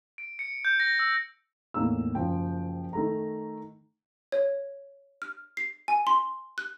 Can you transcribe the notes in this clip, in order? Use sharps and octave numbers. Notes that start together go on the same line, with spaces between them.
D7
C#7
G6
A#6
E6
E2 A2 A#3 D#4 E6
F#1 F3 G5
D#3 A3 A#5
C#5
F6
C7
G#5
C6
F#6